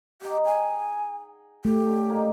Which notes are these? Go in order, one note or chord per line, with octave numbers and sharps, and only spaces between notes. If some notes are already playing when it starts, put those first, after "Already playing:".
D#4 G4 F#5
G#4 G5 G#5
A3 G4
D3 C#4
G#2 A#3